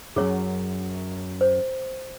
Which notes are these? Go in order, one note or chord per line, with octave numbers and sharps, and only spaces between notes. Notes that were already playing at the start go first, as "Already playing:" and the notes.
F#2 F#3 G#4 C#5
C5